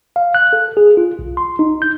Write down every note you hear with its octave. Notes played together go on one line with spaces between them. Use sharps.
F5
F#6
A4
G#4
F4
B1
C6
D#4
G6